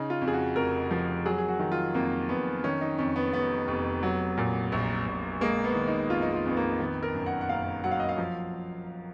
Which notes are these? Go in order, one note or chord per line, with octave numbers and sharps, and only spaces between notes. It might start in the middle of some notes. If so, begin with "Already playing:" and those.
Already playing: C#3 D#4
F4
F2
G#4
F#4
F1 A#4
F3
F#3 G#4
G#4
F#4
D#3
F4
F2 A#3
F2 B3
D#3 C#4
D#4
F2 C#4
B3
F1 B3
F1
F#3
A#2
A#1
A#1
G#3 A#3
B3
D#3
D#4
F2 F4
D#4
F4
F2 B3
A#3
D#3 B3
A#4
F#2
F#5
F#5
F#1 F5
F#3 F#5
F5
D#5
F5
F3